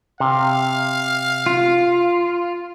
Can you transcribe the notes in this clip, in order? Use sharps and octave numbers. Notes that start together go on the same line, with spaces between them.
C3 F5
F4